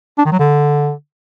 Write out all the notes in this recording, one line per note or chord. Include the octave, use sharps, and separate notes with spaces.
D4
D#3
F#3
D3